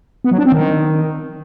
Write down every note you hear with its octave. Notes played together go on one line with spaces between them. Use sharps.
B3
F#3
D4
C4
D#3